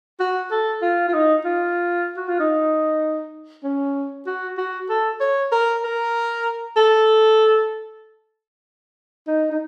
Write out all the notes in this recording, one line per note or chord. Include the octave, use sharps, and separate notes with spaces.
F#4
A4
F4
F4
D#4
F4
F#4
F4
D#4
C#4
F#4
F#4
A4
C#5
A#4
A#4
A4
D#4
D#4